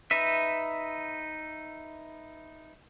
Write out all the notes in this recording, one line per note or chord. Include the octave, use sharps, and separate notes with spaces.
D#4 B4 E5